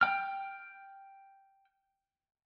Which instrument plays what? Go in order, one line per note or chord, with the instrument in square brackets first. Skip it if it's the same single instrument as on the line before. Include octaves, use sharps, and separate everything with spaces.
[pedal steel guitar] G5 F6